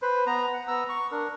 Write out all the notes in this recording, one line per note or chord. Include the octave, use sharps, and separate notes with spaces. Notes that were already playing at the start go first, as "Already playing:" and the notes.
B4 C5
B3 A#5
F#5
B3 A#5 E6
C#6
D4 A#4